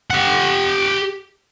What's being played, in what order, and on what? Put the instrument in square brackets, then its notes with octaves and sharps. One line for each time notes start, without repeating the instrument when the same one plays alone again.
[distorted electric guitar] G4 F#5